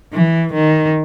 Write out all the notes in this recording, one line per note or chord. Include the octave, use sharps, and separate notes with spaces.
E3
D#3